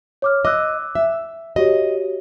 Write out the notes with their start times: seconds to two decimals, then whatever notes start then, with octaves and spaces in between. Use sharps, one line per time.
0.22 C#5 D6 F6
0.45 D#5 D6 E6 F#6
0.95 E5
1.56 F#4 G4 C#5 D#5